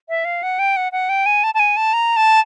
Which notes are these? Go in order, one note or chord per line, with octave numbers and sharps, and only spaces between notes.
E5
F5
F#5
G5
F#5
F#5
G5
G#5
A5
A5
G#5
A5
A#5
A5